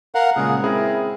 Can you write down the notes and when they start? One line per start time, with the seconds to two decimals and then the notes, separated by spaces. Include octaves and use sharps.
0.15 A#4 F5 F#5
0.36 A#2 C#3 G#3 G#4
0.62 C4 E4 G#4 A#4